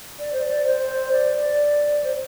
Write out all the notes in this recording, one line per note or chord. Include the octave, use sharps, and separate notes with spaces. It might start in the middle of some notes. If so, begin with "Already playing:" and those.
D5
C5
D5
C5
D5
C5